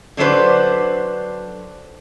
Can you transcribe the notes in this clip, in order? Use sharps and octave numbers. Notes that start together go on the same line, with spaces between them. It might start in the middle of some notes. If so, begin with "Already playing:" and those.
D3 F#3 D4 B4 C5